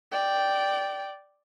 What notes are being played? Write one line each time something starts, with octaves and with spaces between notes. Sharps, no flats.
D5 G5